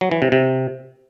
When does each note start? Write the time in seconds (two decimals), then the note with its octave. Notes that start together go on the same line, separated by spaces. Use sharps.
0.01 F#3
0.11 E3
0.22 C3
0.32 C3